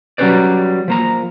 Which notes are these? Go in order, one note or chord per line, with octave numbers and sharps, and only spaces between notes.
F#3 G3 C#4 B4 C5 D5
F3 A#3 A#5